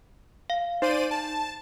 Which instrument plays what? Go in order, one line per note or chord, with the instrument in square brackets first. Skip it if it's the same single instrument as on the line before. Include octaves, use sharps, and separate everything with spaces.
[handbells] F5
[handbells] D#4 [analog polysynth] C5 D5 D#7
[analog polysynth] A5